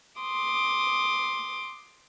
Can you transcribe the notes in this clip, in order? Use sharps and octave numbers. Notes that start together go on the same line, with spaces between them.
C6 D6 D#6